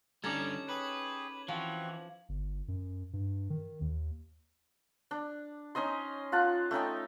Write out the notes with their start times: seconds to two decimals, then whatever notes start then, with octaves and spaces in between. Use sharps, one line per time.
0.24 D3 G3 C#4 D#4 A4 D6 G#6
0.69 G4 G#4 B4 C#5 F#7
1.48 E3 F3 C4 F#4 C#6
2.29 G1
2.68 F#2
3.13 G2
3.50 D#3
3.81 D#2
5.11 D4
5.75 C#4 D#4 D#5 C6
6.32 F4 F#5 A5
6.71 A3 C#4 D#4 G5